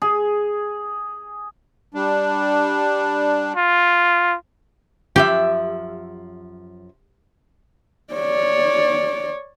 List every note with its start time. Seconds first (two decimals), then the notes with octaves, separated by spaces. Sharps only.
0.02 G#4
1.94 G3 D4
3.57 F4
5.16 F#2 F3 G4 E5
8.13 C#5 D5